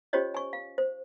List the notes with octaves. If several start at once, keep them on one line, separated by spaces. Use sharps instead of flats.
C#4 F4 G4 C5 C#5 D#5
G#5 C#6
F5
C5